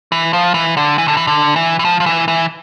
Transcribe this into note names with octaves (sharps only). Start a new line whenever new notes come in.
E3
F3
E3
D3
E3
D3
E3
D3
E3
E3
F3
F3
E3
E3